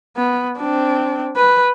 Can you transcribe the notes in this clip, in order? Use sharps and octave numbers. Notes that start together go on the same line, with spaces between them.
B3
C4 D4
B4